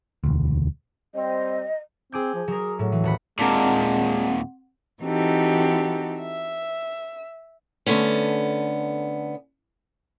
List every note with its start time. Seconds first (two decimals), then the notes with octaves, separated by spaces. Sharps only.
0.24 E1 D2
1.15 G3 C4 D#5
2.12 C4 G#4 D6 G6
2.34 F3
2.48 F#3 G#4 A#4
2.79 A2 F#3
2.92 E3
3.04 D#1 F#5 B5
3.39 D#2 A#2 G#3 C4 D4 A#4 F#5
5.02 E3 C4 D#4 F#4 G4 A4
6.20 E5
7.86 D3 A3 B3 C#4